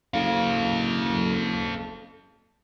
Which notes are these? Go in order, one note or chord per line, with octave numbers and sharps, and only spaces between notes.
F#1 A4 F5